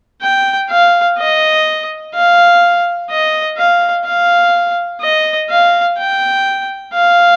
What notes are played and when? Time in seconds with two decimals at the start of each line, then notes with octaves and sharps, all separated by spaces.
0.22 G5
0.69 F5
1.18 D#5
2.14 F5
3.10 D#5
3.57 F5
4.05 F5
5.01 D#5
5.49 F5
5.97 G5
6.93 F5